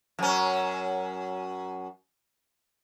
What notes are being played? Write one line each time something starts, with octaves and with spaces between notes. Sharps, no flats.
F#2 C#4